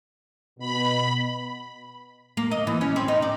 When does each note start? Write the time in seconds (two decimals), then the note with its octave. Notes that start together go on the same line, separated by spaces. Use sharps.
0.59 B2 B5
2.37 A#3
2.51 D#5
2.67 E3
2.81 C#4
2.96 C4
3.08 D#4
3.22 D5